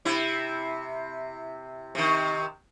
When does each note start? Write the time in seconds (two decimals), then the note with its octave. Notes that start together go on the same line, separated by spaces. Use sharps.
0.05 C3 E4
1.95 C3 D#3